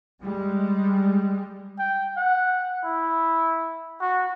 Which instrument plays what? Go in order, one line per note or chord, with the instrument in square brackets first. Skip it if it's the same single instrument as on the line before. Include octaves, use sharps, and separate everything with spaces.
[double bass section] G3 G#3
[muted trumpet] G5
F#5
E4
F#4